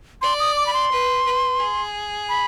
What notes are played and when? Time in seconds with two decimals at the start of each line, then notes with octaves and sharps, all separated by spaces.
0.22 D5 C6
0.40 D#6
0.56 D6
0.67 B5
0.73 C6
0.91 B4
1.26 B4
1.60 G#4
2.29 B5